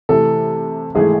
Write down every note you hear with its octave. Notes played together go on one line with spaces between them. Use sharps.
C3 E3 A3 A4
G#1 E3 A3 G#4